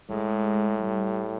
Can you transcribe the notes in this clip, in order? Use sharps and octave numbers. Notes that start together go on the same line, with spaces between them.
A2 G#3
G3